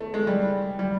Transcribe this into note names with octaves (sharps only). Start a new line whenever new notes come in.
A3
G#3
G3
G3